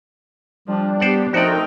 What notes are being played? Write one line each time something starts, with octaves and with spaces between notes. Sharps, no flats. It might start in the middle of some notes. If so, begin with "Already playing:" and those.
F3 G3 D4
B3 G4 C5 D5 F#5
F3 A3 C4 D#4 F#4 A#4 D5 G5